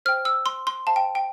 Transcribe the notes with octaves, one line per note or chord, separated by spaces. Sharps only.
C5 G5 F6
E6
C6
C6
C5 F5 A5
G5
G5